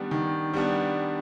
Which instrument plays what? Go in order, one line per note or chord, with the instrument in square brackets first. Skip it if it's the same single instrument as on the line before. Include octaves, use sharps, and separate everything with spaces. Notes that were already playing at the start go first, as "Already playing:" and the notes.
Already playing: [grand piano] D#3 G3 B3 D4
D#3
G3 B3 D4